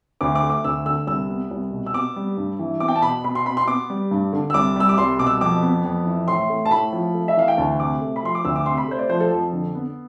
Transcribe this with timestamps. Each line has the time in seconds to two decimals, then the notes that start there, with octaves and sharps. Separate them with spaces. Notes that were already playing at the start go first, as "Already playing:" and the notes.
0.21 D2 D6
0.35 D6
0.42 A3
0.50 D6
0.64 D2 E6
0.86 D3 E6
1.07 C2 E6
1.29 B3
1.51 C2
1.72 B2
1.86 E6
1.94 B3 D6
2.16 G3
2.37 G2
2.59 E3
2.80 B3 D6
2.88 G5
2.96 A5
3.02 B2 B5
3.24 B2 B5
3.35 C6
3.46 B3 B5
3.57 C6
3.67 B3 D6
3.90 G3
4.11 G2
4.33 D3
4.50 E6
4.54 C2 D6
4.76 G3 E6
4.89 D6
4.97 C2 C6
5.19 B2 D6
5.27 E6
5.41 F2 D6
5.62 B3
5.85 F2
6.06 E3
6.28 A2 C6
6.49 A3
6.66 A5
6.71 A2 B5
6.93 F3
7.14 A3
7.28 E5
7.36 E3 F5
7.48 G5
7.58 D2 A5
7.79 C3 D6
8.01 A3
8.16 B5
8.23 F3 C6
8.35 D6
8.45 D2 E6
8.56 D6
8.66 C3 C6
8.78 B5
8.88 A3 C5
8.99 D5
9.10 F3 C5
9.20 A4
9.31 F2
9.53 D3
9.75 B3